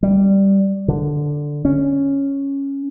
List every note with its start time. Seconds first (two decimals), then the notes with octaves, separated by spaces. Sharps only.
0.03 G3
0.88 D3
1.65 C#4